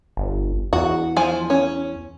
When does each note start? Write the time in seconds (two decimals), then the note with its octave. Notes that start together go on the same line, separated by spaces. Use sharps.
0.17 G1
0.73 E2 F#4
1.17 F3 G#5
1.50 C#4